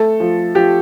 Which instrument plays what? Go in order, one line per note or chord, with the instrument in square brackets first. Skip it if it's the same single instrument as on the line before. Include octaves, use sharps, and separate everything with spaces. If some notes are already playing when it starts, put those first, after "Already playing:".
Already playing: [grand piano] A3 A4
F3
F3 G4